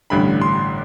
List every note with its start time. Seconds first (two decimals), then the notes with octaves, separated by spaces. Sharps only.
0.10 A1 G2 D3 B5
0.41 C6